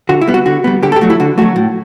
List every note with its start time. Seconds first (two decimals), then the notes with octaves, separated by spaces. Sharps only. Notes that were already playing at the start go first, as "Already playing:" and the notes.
0.09 D3 F#4
0.21 E4
0.27 G3 B3
0.34 F#4
0.46 D3 F#4
0.64 G3 B3
0.83 D3 G4
0.92 A4
0.96 G4
1.01 F#3 A3 F#4
1.10 E4
1.20 D3 F#4
1.38 F#3 A3 F#4
1.56 A2